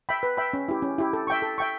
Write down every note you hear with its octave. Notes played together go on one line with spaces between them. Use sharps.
E5 G5 B5
B4
E5 G5 B5
C#4
E4 G4
C#4
E4 G4
A4
E5 G5 C#6
A4
E5 G5 C#6